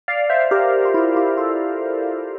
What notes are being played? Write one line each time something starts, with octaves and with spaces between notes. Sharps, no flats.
D5 F5
C5 E5
G4 A#4
F4
E4
E4 G4
F4 A4
A4